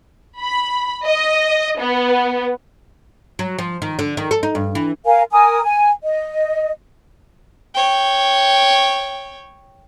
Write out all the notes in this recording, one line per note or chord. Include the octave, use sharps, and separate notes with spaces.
B5
D#5
B3
F#3
F3
D#3
D3
D#3
A4
D#4
G2
E3
A#4 F5 G#5
A#4 G#5 D#6
G#5
D#5
C#5 G5